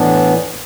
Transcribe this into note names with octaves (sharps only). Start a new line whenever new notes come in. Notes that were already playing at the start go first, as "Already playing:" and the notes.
Already playing: A2 E3 B3 D4